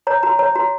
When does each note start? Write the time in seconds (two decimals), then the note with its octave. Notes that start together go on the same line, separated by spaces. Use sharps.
0.07 C#5 A#5
0.23 F#4 A#5
0.39 C#5 A#5
0.55 F#4 A#5